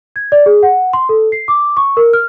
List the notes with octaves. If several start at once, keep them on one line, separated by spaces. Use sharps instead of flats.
G#6
D5
G#4
F#5
C6
A4
C7
D6
C#6
A#4
F6